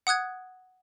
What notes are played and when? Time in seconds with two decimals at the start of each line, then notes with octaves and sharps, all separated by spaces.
0.07 F#5 D#6 F#6 G#6